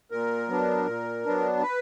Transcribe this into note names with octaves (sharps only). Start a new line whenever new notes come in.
A#2 A#4
F#3 B3 D4
A#2
F#3 B3 D4
B4